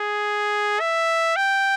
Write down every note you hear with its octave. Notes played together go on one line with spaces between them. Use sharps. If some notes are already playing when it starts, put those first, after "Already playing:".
Already playing: G#4
E5
G5